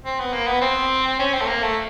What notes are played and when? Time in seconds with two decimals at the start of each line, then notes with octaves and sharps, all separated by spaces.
0.04 C4
0.19 B3
0.33 A#3
0.47 B3
0.61 C4
1.19 C#4
1.34 C4
1.41 A3
1.48 A#3
1.63 A3